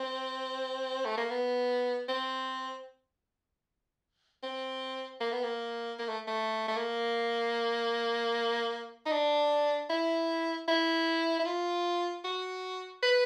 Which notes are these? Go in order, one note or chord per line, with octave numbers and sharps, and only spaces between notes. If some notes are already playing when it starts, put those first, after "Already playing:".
Already playing: C4
A3
A#3
B3
C4
C4
A#3
B3
A#3
A#3
A3
A3
A3
A#3
D#4
D4
E4
E4
E4
F4
F#4
B4